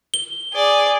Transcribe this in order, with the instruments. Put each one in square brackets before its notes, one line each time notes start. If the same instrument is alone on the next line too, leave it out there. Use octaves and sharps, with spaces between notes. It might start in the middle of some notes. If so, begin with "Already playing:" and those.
[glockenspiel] G7
[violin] G#4 D5